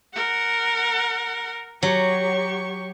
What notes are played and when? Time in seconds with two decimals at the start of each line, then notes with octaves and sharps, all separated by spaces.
0.13 A#4 F#5
1.83 F#3 G4 C#6